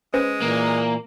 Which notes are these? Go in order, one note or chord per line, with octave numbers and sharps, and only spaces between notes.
G#3 C#4 B4 C5
A#2 E3 A#3